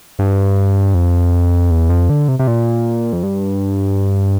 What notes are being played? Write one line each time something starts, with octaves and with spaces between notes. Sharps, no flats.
G2
F2
E2
F2
D3
C3
C3
A#2
F2
G2